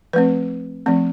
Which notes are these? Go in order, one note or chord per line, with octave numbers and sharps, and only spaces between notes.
F3 A3 C4 B4
F3 A3 C4